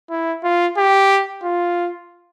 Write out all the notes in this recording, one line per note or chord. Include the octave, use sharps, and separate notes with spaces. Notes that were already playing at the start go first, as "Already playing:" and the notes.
E4
F4
G4
F4